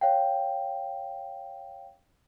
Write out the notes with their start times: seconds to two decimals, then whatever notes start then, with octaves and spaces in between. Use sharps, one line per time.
0.01 C#5 F5 G5